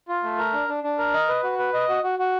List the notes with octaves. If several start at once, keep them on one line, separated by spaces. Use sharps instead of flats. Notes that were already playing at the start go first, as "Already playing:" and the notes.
F4
A3
A#4
D4
D4
D4
A#4
D#5
B4
F#4
B4
D#5
F#4
F#4
F#4